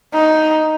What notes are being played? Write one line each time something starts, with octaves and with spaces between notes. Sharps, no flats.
D#4